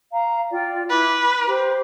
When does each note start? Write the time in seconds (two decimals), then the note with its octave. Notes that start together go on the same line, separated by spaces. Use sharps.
0.11 F5 A#5
0.51 F4 D5 G5
0.90 E4 B4 D6
1.46 G4 C5 D6